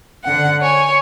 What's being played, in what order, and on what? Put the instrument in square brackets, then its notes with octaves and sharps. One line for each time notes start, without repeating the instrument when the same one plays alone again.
[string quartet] D3 F#5
C#5 G#5